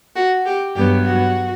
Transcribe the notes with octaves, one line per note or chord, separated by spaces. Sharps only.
F#4
G4
G2 F#3 B3 G4
F#4